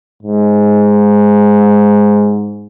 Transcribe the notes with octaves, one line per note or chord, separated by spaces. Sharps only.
G#2